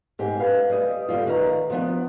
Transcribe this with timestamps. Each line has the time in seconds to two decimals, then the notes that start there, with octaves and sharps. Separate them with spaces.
0.19 G#2 G4 G#4
0.39 B4 F5
0.70 G3 D#5
1.09 G#2 D3 G3 F4
1.27 D#3 B4 E5 A#5
1.70 F3 B3 D4